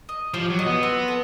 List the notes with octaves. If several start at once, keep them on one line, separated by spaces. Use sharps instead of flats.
D#5
F3 G4
F#3
D#5
B3
C4
A4